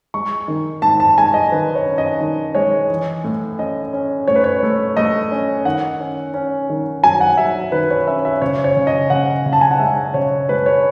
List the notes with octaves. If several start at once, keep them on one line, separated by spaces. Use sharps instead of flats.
G#3 C#6
D#3
G#2 A5
A5
G#3 G#5
D#5
D#3 B4
C#5
C#4
D#5
D#3
G#3 C#5
E3
A2
C#4 D#5
C#4
A2 C#5
B4
C#5
A3
A3 D#5
C#4
D#3 F#5
C#4
C#4
D#3
F#3 G#5
F#5
F#3 E5
D#3 B4
C#5
C#4 E5
E5
C#3 C#5
C#5
C#3
D#5
C#3 F#5
C#3
A5
G#5
F#5
G#3 E5
C#3 C#5
G#3 B4
C#5